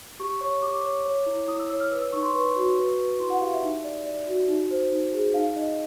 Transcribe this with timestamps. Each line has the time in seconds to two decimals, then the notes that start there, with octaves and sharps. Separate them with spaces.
0.19 G4 C#6
0.41 C#5 C#6
0.62 G4 D6
0.83 C#5
1.05 C#5
1.26 E4
1.48 E4 D#6
1.59 E6
1.70 C#5 E6
1.80 F6
1.91 B4 E6
2.02 E6
2.12 D#4 C#6
2.23 C6
2.33 B4 C#6
2.56 F#4
2.77 B4
2.98 B4
3.19 E4 C6
3.30 F#5
3.41 G4 F5
3.53 E5
3.62 D#4
3.84 D5
4.06 D5
4.27 F#4
4.48 D#4
4.70 C5
4.92 D#4
5.14 G#4
5.34 D#4 F5
5.56 D#4 D#5